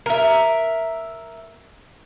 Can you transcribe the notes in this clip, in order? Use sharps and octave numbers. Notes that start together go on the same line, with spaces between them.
A#4 E5